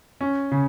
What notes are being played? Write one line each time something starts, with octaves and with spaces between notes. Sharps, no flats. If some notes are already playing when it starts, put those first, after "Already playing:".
C#4
C#3